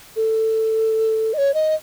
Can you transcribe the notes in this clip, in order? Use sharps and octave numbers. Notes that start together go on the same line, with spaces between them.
A4
D#5
C#5
D#5